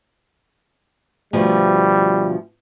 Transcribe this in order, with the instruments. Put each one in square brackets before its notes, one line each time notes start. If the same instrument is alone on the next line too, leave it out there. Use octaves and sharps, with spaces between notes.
[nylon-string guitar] D2 B2 F3 [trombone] G3